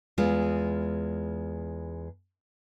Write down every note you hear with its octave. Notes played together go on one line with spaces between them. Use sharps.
E2 G#3 F4